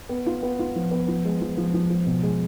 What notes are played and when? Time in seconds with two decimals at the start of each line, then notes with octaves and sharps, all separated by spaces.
0.09 B3
0.26 F4
0.43 B3
0.59 F4
0.76 F3
0.91 B3
1.08 F3
1.25 G#3
1.41 F3
1.57 F3
1.74 F3
1.90 F3
2.06 B2
2.23 G#3